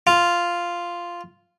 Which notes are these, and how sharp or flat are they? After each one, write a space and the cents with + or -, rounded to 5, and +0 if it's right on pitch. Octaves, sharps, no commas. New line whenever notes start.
F4 -5